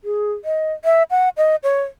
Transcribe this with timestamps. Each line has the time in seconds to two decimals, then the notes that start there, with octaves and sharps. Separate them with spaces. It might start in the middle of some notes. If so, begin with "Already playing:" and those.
0.04 G#4
0.45 D#5
0.85 E5
1.11 F#5
1.37 D#5
1.63 C#5